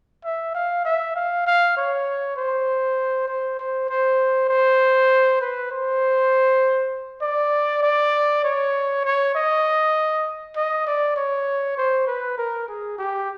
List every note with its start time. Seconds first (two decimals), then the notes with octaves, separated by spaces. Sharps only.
0.25 E5
0.55 F5
0.85 E5
1.16 F5
1.46 F5
1.77 C#5
2.37 C5
3.28 C5
3.59 C5
3.89 C5
4.49 C5
5.41 B4
5.71 C5
7.22 D5
7.83 D5
8.44 C#5
9.05 C#5
9.35 D#5
10.57 D#5
10.86 D5
11.16 C#5
11.78 C5
12.07 B4
12.38 A#4
12.68 G#4
12.98 G4